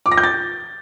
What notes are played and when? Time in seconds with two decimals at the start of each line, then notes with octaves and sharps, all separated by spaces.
0.06 D6
0.12 A#6
0.18 G6
0.23 A6